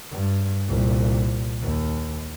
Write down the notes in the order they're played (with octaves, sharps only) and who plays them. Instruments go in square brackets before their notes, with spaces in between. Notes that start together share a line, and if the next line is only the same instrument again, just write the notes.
[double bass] G2
C2 A#2
D#2